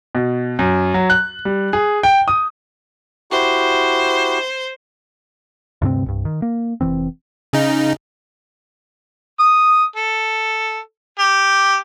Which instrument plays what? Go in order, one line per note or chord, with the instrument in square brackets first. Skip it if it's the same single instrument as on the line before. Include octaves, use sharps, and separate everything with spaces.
[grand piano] B2
F#2
F#3
F#6
G3
G#4
G5
D#6
[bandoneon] E4 F#4 G4 [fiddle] C5
[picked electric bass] D2 G2 C3 C4
C2 G2
D#3
A#3
F1 F2 E3 C4
[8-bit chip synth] C#3 D#4
[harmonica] D#6
A4
G4